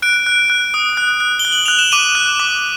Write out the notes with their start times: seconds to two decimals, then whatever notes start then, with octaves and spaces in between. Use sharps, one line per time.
0.02 F#6 D7
0.26 F#6
0.50 F#6
0.74 D#6
0.97 F#6
1.20 F#6
1.39 G7
1.45 F#6
1.52 F#7
1.66 F#6 F7
1.79 E7
1.92 D6 D#7
2.15 F#6
2.40 D6